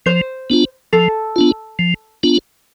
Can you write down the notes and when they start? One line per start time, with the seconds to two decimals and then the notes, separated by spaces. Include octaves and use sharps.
0.06 F3 C5
0.50 B3 D4 F4
0.93 F3 A4
1.36 B3 D4 F4
1.79 F3
2.23 B3 D4 F4